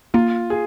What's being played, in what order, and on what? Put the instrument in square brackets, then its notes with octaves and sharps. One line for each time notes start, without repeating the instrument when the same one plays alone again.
[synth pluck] A#3 [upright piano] F4
[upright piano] G#4